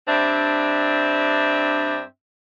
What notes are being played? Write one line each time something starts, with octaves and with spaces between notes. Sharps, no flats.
G2 C4 D4 E5